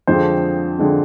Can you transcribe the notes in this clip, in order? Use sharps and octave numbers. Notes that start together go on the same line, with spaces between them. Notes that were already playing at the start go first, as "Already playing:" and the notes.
F2 D3 F3 G#3 C4 C5
D3 F3 G#3 C4